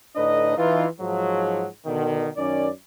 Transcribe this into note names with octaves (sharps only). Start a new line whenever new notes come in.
A2 D3 D4 D#4 B4 D#5
E3 D#4 F4
G#2 F3 F#3
B2 D3 D#3
F#2 D#3 C#4 D5